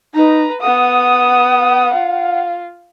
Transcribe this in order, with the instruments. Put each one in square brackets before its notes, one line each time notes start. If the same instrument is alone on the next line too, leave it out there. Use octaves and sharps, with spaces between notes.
[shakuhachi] D#4 [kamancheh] B4 A#5
[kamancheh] B3 D#6 [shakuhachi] F#5
[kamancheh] F4 F5